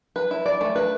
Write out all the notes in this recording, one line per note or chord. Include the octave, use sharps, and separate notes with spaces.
B4
E4
D5
A3
B4